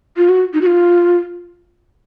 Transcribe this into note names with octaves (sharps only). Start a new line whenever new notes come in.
F4
F#4
D#4
F#4
F4